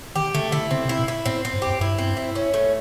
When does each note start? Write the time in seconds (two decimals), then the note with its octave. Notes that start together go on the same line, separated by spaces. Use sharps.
0.16 D#3 G4
0.34 D3 A3
0.52 D3 E4
0.71 C#3 C4
0.85 C3
0.89 E4
0.99 A#2
1.08 E4
1.25 A2 C4
1.45 C4
1.53 G2
1.62 F#2 G4
1.81 G2 E4
1.98 C4
2.17 E4
2.35 C#4
2.54 A3